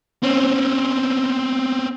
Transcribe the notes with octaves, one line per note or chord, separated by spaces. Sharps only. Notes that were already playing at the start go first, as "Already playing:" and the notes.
C4 C#4